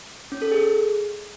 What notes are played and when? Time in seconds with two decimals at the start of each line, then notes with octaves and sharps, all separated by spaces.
0.32 C#4
0.42 A4
0.52 G#4